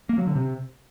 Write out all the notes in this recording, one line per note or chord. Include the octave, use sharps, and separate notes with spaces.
A#3
F#3
D3
C3